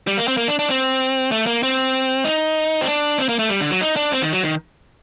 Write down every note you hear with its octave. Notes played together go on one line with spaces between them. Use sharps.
G3
A#3
C4
A#3
D4
D4
C4
A3
A#3
C4
D#4
C4
D4
C4
A#3
A3
G3
D3
F#3
D#4
D4
C4
D#3
F#3
D#3